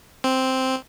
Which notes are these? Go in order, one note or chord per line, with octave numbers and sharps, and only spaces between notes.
C4